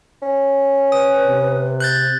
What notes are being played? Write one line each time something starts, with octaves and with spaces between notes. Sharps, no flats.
C#4
B4 D#6
C3
F#6 G6 A6